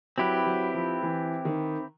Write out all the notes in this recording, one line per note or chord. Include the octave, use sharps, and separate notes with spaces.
F#3 C4 E4 G4 B4
F#3
F3
E3
D#3